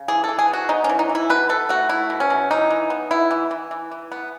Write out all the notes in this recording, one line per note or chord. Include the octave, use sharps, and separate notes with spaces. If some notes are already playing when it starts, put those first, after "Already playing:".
Already playing: C#3
E3 G#4
E3 A4
G#4
B3
F#4
B3 D#4
C#4
E3
D#4
E3
E4
B2 B4
B2 A4
A3 F#4
A3 E4
B2
C#4
B2
E3 D#4
E3
B3
B3 E4
E3
E3
E3
E3
B3